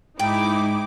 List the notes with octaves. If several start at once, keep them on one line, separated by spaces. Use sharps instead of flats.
G#2 D#4 E4 G5 D6